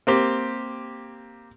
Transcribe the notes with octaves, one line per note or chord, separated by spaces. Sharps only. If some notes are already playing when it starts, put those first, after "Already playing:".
A#3 C4 G4